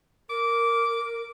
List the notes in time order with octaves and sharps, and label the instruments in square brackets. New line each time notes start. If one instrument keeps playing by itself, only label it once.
[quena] A#4 [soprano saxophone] D6